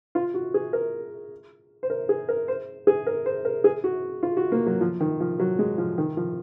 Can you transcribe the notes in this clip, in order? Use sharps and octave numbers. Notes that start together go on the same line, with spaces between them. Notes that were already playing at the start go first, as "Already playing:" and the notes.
F4
F#4
G#4
A#4
C5
A#4
G#4
A#4
C5
G#4
A#4
C5
A#4
G#4
F#4
F4
F#4
A#3
F#3
F3
D#3
F3
F#3
G#3
F3
D#3
F3